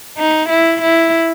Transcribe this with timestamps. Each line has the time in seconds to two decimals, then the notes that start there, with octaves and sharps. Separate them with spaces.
0.18 D#4
0.49 E4
0.82 E4